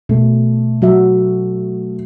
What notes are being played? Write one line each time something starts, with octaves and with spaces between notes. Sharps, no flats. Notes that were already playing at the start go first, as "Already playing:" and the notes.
B2 A3
F#3 F#4 E5